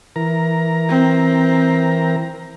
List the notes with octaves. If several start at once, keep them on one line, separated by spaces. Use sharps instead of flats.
E3 A#4 A#5
C4